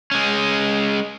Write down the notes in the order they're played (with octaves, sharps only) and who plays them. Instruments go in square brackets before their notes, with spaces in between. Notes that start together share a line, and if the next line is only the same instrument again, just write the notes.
[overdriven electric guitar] G#3 C#4